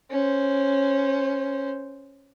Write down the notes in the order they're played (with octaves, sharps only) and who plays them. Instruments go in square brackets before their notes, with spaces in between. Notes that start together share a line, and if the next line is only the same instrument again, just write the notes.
[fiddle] C#4 C5